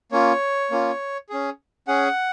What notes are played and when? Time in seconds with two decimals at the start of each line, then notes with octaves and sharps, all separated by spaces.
0.12 A#3 C#4 F4 C#5
0.71 A#3 C#4 F4
1.29 C#4 G#4
1.88 C#4 G#4 F#5